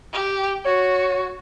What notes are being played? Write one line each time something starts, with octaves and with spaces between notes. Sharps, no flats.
G4
F#4 C#5